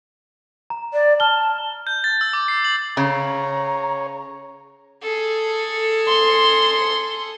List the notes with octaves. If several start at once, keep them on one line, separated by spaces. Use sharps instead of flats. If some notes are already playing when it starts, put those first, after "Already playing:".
A#5
D5
A5 F6 G7
G6
A6
E6
D6
C7
F#7
C#3 C#5 A#5
G#4 A4
C6